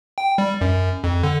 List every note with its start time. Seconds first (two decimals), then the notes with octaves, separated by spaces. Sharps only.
0.18 G5
0.38 G3
0.61 F#2
1.04 F2
1.24 D3